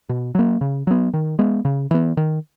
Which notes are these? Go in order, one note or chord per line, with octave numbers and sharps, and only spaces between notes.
B2
F#3 A#3
C#3
F#3 B3
D#3
G#3 B3
C#3
E3 B3
D#3